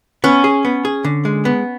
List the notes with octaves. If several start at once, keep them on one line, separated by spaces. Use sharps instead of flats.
B3 C#4
G#4
B3
G#4
D3
G#3
B3